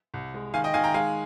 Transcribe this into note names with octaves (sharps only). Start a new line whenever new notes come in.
C2
G#3
D#3 F5 G#5
D#5 G5
D#3 F5 G#5
G5 A#5
G#3 F5 G#5